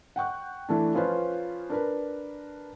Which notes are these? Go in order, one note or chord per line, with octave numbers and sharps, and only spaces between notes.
F#5 G5 C#6 F#6
E3 A3 D4
F3 C#4 F4 B4 C5
D4 A#4 B4